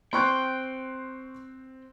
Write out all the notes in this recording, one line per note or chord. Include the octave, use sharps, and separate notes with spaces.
C4 G5 C6 C#6 F#6